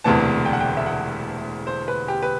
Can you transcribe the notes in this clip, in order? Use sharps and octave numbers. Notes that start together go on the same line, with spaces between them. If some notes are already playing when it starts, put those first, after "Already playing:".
E1 D2 C3 E3 B3 A5
G5
F#5
G5
E5
F#5
C5
B4
G4
B4